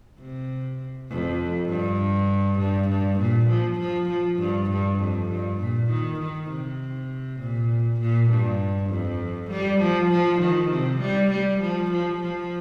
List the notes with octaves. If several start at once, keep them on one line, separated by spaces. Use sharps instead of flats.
C3
F2
G2
G2
G2
A#2
F3
F3
F3
G2
G2
F2
G2
A#2
D#3
D#3
C3
A#2
A#2
G2
F2
G3
F3
F3
D#3
C3
G3
G3
F3
F3
F3